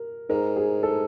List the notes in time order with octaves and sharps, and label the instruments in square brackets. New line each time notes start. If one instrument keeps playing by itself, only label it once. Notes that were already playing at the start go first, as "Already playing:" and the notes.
Already playing: [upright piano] A#4
[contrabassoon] G#2 [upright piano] A#4
[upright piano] G#4
A4